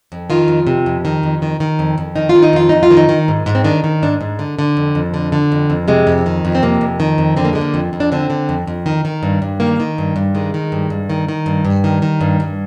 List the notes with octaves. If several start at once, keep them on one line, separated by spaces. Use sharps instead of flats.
F2
D#3 F4
F2
C3
F2
D#3
F2
D#3
D#3
F2
F2
D#3 D#4
F4
D#3
D#4
F2 F4
F2 D#4
F4
D#3
D#4
D#3
G#2
G#2
C4
D#3 D4
D#3
G#2 D4
G#2
D3
D3
F2
F2
D3
D3
F2
F2
C3 G#3
F2
D#3
F2
C4
C3 A#3
F2
D#3
F2
D3 C4
A#3
D3 G#3
A#3
F2
F2
D4
D3 C4
D3
F2
F2
D#3
D#3
G2
G2
D#3 A#3
D#3
G2
G2
D#3 G#3
D#3
G2
G2
D#3
D#3
G2
G2
D#3
D#3
G2
G2